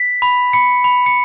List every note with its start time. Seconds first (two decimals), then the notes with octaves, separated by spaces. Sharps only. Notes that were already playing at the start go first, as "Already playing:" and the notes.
Already playing: B6
0.22 B5
0.53 B5 C#7
0.84 B5
1.06 C#7